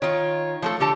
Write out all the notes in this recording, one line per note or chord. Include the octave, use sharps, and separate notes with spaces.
D#3 F4 C#5
F3 A3 A4
D3 G4 A4 A5